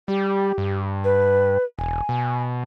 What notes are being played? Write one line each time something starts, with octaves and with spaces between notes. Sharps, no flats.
G3 G4
G2
B4
E1 G#5
B2